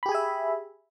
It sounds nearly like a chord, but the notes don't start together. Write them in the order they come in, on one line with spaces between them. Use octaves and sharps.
B5 G4 G#4 G#5 E5